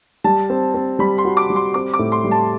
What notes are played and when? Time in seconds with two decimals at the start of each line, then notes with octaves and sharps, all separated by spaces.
0.24 G3 A5
0.50 C4
0.74 C4
0.99 G3 B5
1.18 C6
1.25 F#4
1.37 D6
1.50 G3
1.56 C6
1.74 C4 D6
1.94 D6
1.99 A2
2.12 C6
2.24 G3
2.31 A5